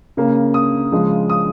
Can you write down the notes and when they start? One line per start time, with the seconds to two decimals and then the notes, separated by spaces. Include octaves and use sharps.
0.17 C#3 A#3 C#4
0.54 D#6
0.92 C#3 F3 G#3
1.30 D#6